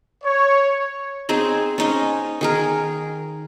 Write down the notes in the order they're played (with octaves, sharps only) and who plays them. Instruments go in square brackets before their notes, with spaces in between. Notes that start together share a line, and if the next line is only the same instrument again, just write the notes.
[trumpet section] C#5
[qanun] C4 D#4 G#4
C#4 D#4 D#5
D#3 G#4 A#4